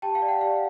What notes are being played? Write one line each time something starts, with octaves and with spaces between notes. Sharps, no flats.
G4 G5 A5
F5 G5
D5
F#5
G4 F5